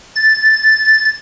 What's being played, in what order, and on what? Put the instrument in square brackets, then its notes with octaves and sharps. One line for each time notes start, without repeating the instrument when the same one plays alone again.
[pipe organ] A6